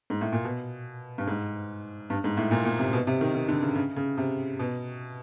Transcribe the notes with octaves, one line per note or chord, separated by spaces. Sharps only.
G#2
A2
A#2
B2
G2
G#2
G2
G#2
A2
A#2
A#2
C3
B2
C3
D#3
D#3
D3
C#3
C#3
C#3
C3
B2